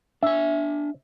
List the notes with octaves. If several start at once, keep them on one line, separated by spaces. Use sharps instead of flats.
D4 E5 G#5